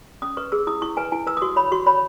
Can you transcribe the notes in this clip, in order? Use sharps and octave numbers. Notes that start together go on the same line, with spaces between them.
C#4 D#6
B4 C#6
G#4 E6
E4 D#6
E4 C#6
B4 G#5
E4 G#5
B4 E6
D#6
F#4 C#6
C#5 B5
F#4 C#6
C#5 B5